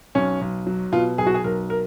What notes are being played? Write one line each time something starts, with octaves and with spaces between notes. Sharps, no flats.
B1 C#4
B1
F#3
B2 F4
B1 G#4
F#4
G#4
B1 A#4
A#4